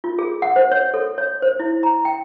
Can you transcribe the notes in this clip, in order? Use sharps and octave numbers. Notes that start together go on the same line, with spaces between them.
F4
G#4
F#5
C5
C#5
A4
C#5
C5
E4
A#5
G5